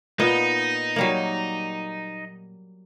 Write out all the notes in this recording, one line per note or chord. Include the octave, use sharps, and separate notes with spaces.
A#2 B3 D#4 D#5
F#3 G3 A#3